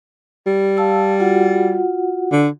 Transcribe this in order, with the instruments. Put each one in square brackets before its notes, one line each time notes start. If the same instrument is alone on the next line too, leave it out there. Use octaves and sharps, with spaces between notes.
[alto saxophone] G3
[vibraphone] F5 A5 E6
F4 F#4 F#5
[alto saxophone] D3